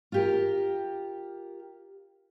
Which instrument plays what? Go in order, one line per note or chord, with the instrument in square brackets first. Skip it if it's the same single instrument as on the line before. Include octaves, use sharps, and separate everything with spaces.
[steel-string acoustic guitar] F4 G4 A#4